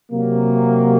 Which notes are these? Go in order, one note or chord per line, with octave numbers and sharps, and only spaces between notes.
C3 F#3 A#3